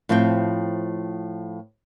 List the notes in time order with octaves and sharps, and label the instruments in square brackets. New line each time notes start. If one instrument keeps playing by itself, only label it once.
[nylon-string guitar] A2 F3 C4 E5 G5